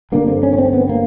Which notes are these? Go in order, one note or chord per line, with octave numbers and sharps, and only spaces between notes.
G1 G2 D3 A#3
C4
C#4
C#4
C4
B3
A#3